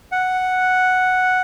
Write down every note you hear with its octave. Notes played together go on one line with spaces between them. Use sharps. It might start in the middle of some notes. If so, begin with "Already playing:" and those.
F#5